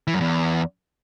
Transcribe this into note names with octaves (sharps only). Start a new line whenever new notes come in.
E3
F#2
E2